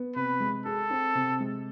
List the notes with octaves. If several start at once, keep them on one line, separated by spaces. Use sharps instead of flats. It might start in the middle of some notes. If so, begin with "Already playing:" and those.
Already playing: B3
C3 B4
G#3
G#4 A4
C4
C3
G#3